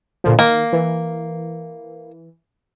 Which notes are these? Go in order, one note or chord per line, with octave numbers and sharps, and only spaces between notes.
A#2 D3 F3
D#3 A#3
E3